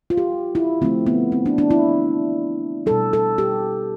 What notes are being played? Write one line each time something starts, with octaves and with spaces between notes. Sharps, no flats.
F4
G4
E4
D3 F3 A3 C4
B3
C4
D4
D4
E4
B2 G3 A4
A4
G4